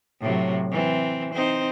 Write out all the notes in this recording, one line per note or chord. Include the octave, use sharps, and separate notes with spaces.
A2 C3 F#3
E3 C4
C4 D#4 C5